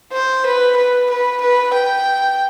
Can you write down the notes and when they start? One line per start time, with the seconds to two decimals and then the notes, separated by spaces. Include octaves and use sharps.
0.13 C5
0.46 B4
0.77 B4
1.10 B4
1.41 B4
1.74 G5